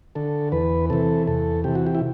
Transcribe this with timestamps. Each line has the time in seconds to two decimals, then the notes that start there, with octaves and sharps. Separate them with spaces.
0.15 D3 A4
0.52 E2 B4
0.90 C3 E3 A4
1.27 E2 A4
1.64 C3 E3 G4
1.75 F#4
1.87 G4
1.95 E4